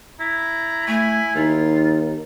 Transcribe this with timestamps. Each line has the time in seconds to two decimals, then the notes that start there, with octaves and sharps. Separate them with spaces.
0.20 E4 A#5
0.87 A3 G#5
1.36 D#2 D#4 F4